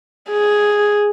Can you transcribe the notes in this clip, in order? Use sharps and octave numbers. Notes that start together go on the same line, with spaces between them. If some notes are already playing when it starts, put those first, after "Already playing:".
G#4